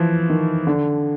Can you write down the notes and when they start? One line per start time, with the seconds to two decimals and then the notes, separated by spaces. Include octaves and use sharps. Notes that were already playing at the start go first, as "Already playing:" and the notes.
Already playing: E3 F3
0.30 D#3
0.67 D3